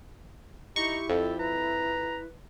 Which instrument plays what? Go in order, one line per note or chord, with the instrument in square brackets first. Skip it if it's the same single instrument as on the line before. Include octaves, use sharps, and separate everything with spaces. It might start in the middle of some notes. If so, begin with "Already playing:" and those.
[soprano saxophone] D#4 [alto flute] E4 [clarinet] G4 [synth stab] C#6
[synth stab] F2 [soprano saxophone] G4 [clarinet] A4
[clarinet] B4 [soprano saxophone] A#5